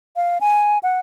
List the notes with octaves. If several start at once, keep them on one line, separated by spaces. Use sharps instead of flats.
F5
G#5
F#5